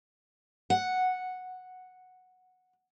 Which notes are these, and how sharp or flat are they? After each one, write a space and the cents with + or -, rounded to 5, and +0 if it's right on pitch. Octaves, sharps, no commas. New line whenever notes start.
F#5 -5